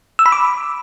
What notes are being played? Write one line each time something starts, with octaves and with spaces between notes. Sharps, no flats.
E6
B5
D6